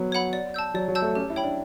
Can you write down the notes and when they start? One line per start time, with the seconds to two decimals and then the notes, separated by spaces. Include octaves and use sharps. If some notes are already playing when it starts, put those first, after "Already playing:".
Already playing: F#3 B3
0.12 C#5 F#5 B5
0.33 D5
0.54 A5 E6 G6
0.74 F#3 D5
0.88 F#3
0.95 A5 E6 G6
1.02 A3
1.15 C#4 G4
1.30 E4
1.36 C#5 G5 B5
1.44 D4